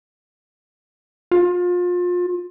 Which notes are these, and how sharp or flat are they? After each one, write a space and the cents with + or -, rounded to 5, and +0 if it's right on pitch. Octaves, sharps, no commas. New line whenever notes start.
F4 +30